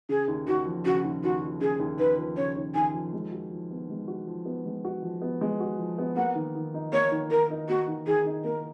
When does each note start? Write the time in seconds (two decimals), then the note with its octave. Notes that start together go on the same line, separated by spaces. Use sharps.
0.09 C#3 G#4
0.28 D#2
0.47 D#2 F#4
0.66 F3
0.85 C#3 F#4
1.05 D#2
1.24 D#2 F#4
1.42 F3
1.61 C#3 G#4
1.80 D#2
1.99 D#2 B4
2.18 F3
2.37 C#3 C#5
2.57 D#2
2.75 D#2 G#5
2.94 F3
3.13 G#3
3.32 F#4
3.52 F3
3.71 B3
3.90 G#3
4.08 F#4
4.27 F3
4.45 B3
4.66 G#3
4.85 F#4
5.03 F3
5.22 B3
5.41 G#3
5.60 F#4
5.79 F3
5.98 B3
6.16 A#3 F#5
6.35 D#3
6.55 D#3
6.74 D#4
6.92 A#3 C#5
7.12 D#3
7.30 D#3 A#4
7.50 D#4
7.69 A#3 F#4
7.88 D#3
8.07 D#3 G#4
8.26 D#4
8.44 A#3 A#4